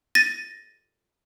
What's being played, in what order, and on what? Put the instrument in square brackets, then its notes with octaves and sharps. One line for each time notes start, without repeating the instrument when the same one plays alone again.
[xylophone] A6 A#6 D#7